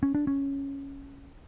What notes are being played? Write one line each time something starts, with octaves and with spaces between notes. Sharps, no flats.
C#4
D4
C#4